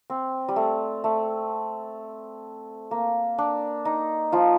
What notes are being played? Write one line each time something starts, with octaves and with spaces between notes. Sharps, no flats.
C4
G3
A3
A3
A#3
D4
D#4
F3 F4